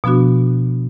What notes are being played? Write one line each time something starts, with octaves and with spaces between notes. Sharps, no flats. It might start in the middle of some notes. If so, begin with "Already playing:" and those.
B2 F3 B3 D4 F#4